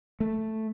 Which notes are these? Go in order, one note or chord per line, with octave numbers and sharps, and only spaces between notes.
A3